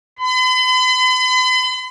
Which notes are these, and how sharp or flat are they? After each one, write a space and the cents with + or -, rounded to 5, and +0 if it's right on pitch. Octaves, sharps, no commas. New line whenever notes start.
B5 +45